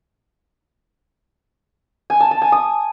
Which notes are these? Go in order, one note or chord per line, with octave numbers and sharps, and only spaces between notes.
G#5
A5
A5
G#5
D#6